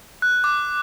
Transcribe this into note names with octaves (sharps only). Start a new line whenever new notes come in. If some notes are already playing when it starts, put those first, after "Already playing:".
F#6
D6